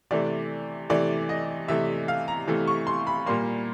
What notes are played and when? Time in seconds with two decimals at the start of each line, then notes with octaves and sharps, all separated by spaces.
0.11 C3 E3 A3 D5
0.90 C3 E3 A3 D5
1.29 D#5
1.68 C3 E3 A3 E5
2.08 F5
2.28 A#5
2.47 C3 E3 A3
2.68 C#6
2.87 C6
3.07 B5
3.26 A#2 G3 A#3 C6